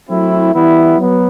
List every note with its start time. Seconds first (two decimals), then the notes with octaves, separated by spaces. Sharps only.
0.09 F#3 A3 C4 E4
0.54 E3 G3 B3 E4
0.98 F#3 B3